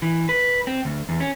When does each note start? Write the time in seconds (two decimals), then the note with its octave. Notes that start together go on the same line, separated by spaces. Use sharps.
0.02 E3
0.29 B4
0.67 C4
0.85 D2
1.09 E2
1.20 C#4